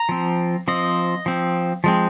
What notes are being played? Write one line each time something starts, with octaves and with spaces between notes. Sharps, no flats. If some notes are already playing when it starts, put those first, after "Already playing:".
Already playing: A#5
F3 C4
F3 C4 D#5
F3 C4
F3 G#3 C4